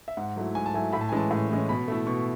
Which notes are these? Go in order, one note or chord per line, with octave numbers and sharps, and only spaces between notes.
E5
G#2 F#5
F#3 A3 E4
G#2 G#5
A5
F#3 A3 E4 G#5
A2 B5
A5
G#5
E3 G#3 C#4 A5
A2
E3 G#3 C#4
B2 B5
A3 E4
B2 C#6